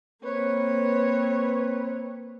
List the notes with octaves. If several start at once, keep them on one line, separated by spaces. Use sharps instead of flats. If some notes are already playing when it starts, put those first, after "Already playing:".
A#3 C4 B4 C#5